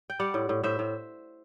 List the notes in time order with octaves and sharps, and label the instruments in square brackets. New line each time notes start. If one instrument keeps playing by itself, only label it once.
[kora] G5
G3 D5 F#5
A2
A2
A2 C5 E5
A2